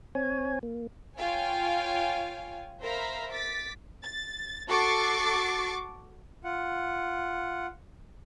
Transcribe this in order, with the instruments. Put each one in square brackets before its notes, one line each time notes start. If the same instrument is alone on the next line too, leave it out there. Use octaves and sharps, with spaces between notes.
[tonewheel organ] C4 C#5 G#5
A#3
[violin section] F4 C#5 F5 G5 G#5
A#4 C5 E5 F5 A#5 B5
D6 A6 B6
A6
F#4 A4 C#6 D6 A6 C7
[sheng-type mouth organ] F4 F#5